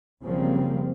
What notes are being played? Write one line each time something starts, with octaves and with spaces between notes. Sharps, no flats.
F#1 C#3 F3 G3 A#3 C4